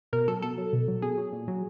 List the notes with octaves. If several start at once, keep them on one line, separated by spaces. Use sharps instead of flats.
B2 A#4
F#3 A4
B2 A4
F#3
B2
F#3
B2 G#4
F#3
A#2
F#3